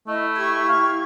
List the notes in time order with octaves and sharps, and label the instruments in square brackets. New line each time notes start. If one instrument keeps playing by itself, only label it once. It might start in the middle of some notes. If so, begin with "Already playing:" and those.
[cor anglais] A3 [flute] E4 [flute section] D#5
[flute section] G4 C#6 G#6
[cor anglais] F5